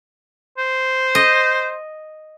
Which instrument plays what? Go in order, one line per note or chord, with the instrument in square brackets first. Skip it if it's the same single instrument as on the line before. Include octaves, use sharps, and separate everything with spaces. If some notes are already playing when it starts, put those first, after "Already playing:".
[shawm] C5
[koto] D#5